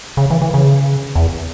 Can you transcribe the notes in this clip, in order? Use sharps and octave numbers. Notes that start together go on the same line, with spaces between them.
C#3
E3
E3
C#3
E2